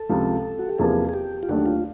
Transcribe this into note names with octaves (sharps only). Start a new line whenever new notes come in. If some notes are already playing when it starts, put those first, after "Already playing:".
Already playing: A4
C#2 C3 F3
F#4
G4
E2 C3 F3 A#3 G#4
G#4
G4
F4
D#2 D3 F#3 A3 D4 F#4
F4